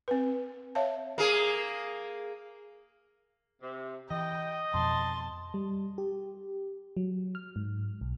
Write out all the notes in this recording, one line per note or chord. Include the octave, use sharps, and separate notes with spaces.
C4 B4
C#5 E5 F5 A5
A#3 G#4
C3
E3 D#5 G5
F2 B2 F3 A5 C6
G3
G4
F#3
F6
G#2
B1